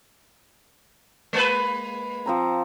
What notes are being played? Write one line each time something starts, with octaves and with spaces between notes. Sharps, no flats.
G#3 A#3 B4
F3 C4 A#5